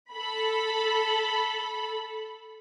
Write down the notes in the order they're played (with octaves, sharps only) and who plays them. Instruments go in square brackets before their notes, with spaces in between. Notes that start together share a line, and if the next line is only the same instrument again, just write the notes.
[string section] A4 B5